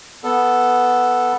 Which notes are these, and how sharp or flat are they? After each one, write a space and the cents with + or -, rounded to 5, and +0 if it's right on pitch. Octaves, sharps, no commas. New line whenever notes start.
B3 +0 A4 +0